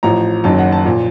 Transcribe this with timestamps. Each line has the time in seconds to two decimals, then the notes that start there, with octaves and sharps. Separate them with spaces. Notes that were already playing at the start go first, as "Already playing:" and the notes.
0.03 A1 A2 F3 A#5
0.44 F#1 F#2 D#3 F#3 A5
0.58 F#5
0.72 A5
0.85 A#2 F3